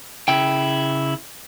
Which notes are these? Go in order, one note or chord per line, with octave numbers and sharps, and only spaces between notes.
C#3 E4 G5